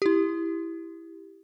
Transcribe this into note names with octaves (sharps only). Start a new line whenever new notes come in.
E4 G4